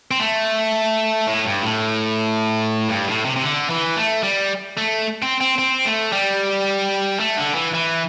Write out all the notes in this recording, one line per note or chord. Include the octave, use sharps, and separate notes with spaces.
C4
A3
A2
G2
A2
G2
A2
C3
C3
D3
E3
A3
G3
A3
C4
C4
C4
A3
G3
A3
D3
E3
E3